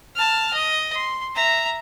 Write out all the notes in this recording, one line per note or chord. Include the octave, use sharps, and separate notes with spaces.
A5 F6
D#5
C6
E5 A#5